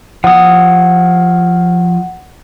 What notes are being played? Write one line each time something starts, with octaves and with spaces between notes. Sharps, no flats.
F3 F#5 D#6